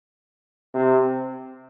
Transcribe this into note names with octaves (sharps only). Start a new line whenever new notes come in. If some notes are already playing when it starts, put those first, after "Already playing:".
C3